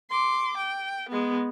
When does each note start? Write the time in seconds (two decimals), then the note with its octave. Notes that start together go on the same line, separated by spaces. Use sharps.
0.10 C6 D6
0.57 G5
1.09 G#3 B3